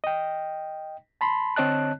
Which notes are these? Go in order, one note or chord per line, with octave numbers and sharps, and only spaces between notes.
D#5 G5
A5 B5 C6
D3 C4 C#5 D#5 A5 F#6